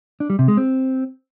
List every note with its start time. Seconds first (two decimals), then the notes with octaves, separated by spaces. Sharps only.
0.20 D4
0.30 G3
0.39 C3
0.48 G#3
0.57 C4